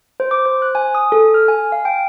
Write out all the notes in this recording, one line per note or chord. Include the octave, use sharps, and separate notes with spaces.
C5
D6
C5
F#6
G#5
D#6
A4
F6
G#5
F5
G5